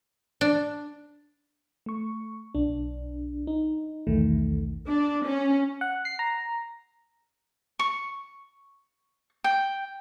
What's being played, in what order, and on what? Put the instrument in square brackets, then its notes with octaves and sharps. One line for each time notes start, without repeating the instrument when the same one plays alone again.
[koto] D4
[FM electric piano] A3 C#6
B1 D4
D#4
B1 E2 D#3 A3
[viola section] D4
C#4
[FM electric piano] F#5
C7
A#5
[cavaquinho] C#6
G5